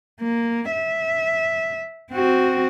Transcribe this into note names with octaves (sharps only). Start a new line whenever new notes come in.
A#3
E5
C4 F#4